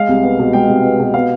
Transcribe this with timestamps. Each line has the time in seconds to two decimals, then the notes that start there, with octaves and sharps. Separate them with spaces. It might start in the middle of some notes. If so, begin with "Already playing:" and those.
Already playing: G#3 F5
0.09 C2
0.23 B3
0.39 B2
0.53 G#3 G5
0.69 C2
0.84 B3
1.00 B2
1.14 B3 F5